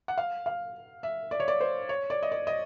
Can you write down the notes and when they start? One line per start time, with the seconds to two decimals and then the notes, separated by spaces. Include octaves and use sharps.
0.08 F#5
0.18 F5
0.46 F5
1.03 E5
1.31 D5
1.40 C#5
1.48 D5
1.60 C5
1.89 C#5
2.10 D5
2.23 D#5
2.32 D5
2.47 D#5